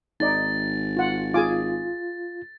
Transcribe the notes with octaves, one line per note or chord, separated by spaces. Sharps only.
G#1 D#4 D5 A6
F4 F#5
F4 G#4 G#5 D6